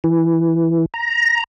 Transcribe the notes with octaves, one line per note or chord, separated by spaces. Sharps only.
E3
A#5